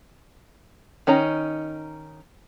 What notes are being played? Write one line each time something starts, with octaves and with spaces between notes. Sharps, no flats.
D#3 C#4 D#4 A#5